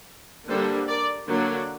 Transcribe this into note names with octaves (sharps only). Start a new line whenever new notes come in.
D3 G3 A#3 D4 A4 C5
A#4 D5
D3 F#3 A#3 D4